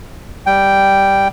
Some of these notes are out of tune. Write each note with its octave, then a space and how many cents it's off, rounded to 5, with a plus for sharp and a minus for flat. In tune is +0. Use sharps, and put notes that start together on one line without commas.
G3 +0 G5 +0